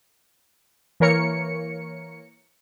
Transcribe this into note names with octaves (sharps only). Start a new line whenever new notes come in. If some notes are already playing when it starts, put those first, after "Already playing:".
E3 A#3 A#4 C#5 C#7